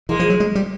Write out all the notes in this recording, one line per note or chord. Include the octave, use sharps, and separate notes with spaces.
E3 G#3 A#3
F3
F#3
G#3
G3